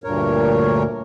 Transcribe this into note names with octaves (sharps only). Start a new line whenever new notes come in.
D2 G2 A#2 A#4 C#5